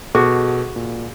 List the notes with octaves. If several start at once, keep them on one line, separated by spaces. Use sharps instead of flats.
B2 F#4 G#4 A4
A#2